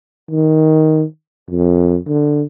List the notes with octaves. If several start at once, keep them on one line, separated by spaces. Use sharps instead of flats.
D#3
F2
D3